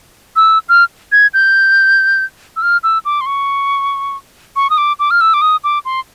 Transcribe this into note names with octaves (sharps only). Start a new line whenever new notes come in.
E6
F6
G#6
G6
E6
F6
E6
D6
C6
C#6
C#6
D#6
D6
D6
F6
E6
D6
D#6
D6
C6